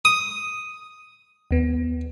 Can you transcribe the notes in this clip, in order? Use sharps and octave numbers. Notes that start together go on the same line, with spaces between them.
D#6
D#2 B3